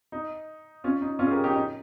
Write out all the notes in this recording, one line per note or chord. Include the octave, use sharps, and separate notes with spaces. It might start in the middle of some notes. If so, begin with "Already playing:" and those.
D#4
C#4 F4
D#4
C#4 F4
G#4
G4 A#4
D#4 G4
D#4